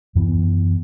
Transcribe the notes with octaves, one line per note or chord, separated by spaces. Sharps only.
F#2 E3 B3